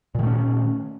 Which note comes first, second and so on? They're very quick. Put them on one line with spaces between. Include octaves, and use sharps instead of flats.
A#2 D#3 A3 C#4